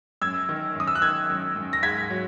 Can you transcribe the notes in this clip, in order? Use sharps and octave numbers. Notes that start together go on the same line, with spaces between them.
F#2 E6 G#6
D#3
F#2 D#6
E6
F#6
D#3 E6 G#6
F#2
F#2
A#6
G#2 G#6 B6
F#3